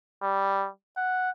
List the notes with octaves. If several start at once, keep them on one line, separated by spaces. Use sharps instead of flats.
G3
F#5